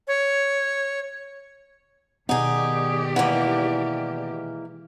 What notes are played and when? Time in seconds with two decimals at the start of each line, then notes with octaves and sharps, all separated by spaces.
0.08 C#5
2.29 B2 D#3 B3 D#4 G4 G#4 D5 F#5
3.16 E3 G#3 A#3 F#5